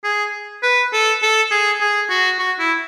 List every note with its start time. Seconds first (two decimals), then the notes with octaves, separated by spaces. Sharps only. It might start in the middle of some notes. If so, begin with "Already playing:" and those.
0.04 G#4
0.62 B4
0.93 A4
1.22 A4
1.51 G#4
1.81 G#4
2.09 F#4
2.39 F#4
2.59 E4